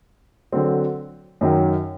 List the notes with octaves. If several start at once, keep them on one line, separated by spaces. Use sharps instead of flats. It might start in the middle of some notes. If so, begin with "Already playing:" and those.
D3 F#3 C4
F#2 D#3 F#3